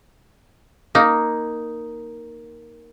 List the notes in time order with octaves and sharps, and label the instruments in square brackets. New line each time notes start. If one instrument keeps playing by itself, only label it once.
[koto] A#3 D#4